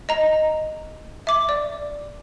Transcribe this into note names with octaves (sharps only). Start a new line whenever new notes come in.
D#5 A#5
E5 D6
D5